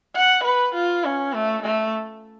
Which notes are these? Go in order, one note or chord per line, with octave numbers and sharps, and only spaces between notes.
F#5
B4
F4
C#4
A3
A3